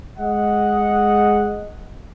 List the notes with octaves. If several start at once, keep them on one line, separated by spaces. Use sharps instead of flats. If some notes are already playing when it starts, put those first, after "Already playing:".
G#3 D#5 F#5